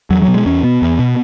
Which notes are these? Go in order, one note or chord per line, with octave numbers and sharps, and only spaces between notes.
E2 F#3
F#3
B2
G#3
E2 C#4
B2 B3
E2
B2